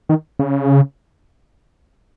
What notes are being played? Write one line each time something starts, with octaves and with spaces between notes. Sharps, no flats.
D#3
C#3